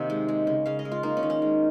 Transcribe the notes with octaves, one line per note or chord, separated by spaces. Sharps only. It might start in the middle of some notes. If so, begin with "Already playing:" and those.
Already playing: C3 D#3 A#3
G#3
G#3
C#3
C#3 F5
D#5
G#3
F4
A#3 D#4
C#4
D#3
C#4
G#3